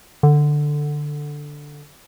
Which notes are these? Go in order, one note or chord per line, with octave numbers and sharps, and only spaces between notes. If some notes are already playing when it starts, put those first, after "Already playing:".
D3